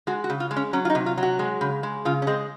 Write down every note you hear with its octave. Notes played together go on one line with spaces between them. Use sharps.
G#3 F#4
F#4
C#3
F4
G#3
C#4
F#3 C#4
F4
D#4
C3
F4
F#3
F#4
G#3
C#3
G#3
C#3 F4
C#4
G#3 C4